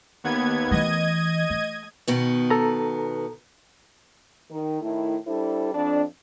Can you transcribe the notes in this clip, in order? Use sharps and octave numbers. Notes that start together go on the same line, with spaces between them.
D#2 B3 G#6
E3 A3 D#5 G#6 D#7
A3
B2 D#3 B3
A4 A#5
D#3
A2 D#3 A3 E4
G3 D4 E4 A4 C5
F2 D4